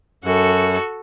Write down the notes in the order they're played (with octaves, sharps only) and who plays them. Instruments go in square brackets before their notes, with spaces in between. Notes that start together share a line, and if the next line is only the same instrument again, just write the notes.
[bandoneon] F#2 [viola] F#4 A4